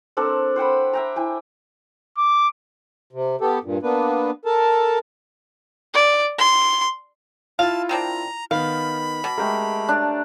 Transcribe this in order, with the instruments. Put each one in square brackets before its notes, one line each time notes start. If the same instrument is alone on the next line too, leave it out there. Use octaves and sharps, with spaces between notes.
[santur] C4 D4 A4 A#4
C5 F#5 G5 B5
E5 G5 A#5
E4 G5 G#5
[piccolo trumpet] D6
[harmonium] C3
B3 G4 A4
G2 A#2
A#3 B3 D4 B4
A4 A#4 A5
[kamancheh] D5
C6
[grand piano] E4 F4 [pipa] F5 [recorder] A5
[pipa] D#3 C4 D4 [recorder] A#5
[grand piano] D#3 B3 [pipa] F5 [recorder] B5
[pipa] B2 [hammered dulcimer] D6
[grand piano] G#3 [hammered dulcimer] A3 G4 A#4
[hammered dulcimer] D4 D5